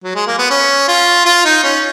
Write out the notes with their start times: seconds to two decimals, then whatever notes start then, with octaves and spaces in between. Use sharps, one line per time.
0.04 F#3
0.15 G#3
0.27 A#3
0.39 B3
0.50 C#4
0.88 F4
1.26 F4
1.45 D#4
1.63 C#4